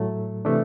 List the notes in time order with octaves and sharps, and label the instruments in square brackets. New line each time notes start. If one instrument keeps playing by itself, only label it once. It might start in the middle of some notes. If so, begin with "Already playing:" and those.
Already playing: [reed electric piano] A2 F#3 A3
C3 E3 A3 D4